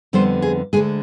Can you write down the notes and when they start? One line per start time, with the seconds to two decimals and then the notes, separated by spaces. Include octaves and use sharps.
0.13 F2 D3 G3 B3 C5
0.42 G#4
0.73 D2 D3 G#3 G#4